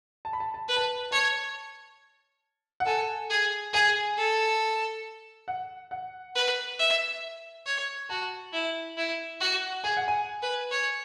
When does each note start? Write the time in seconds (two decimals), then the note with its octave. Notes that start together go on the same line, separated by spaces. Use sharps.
0.25 A5
0.33 B5
0.40 A5
0.54 A5
0.68 B4
0.76 A5
0.83 B5
1.11 C#5 A5
2.80 F#5
2.86 A4 G#5
3.30 G#4
3.73 G#4 G#5
4.17 A4
5.48 F#5
5.91 F#5
6.36 B4
6.79 E5
7.66 C#5
8.10 F#4 A5
8.53 E4
8.97 E4
9.40 F#4
9.84 G#4 G#5
9.97 F#5
10.08 G#5
10.42 B4
10.71 C#5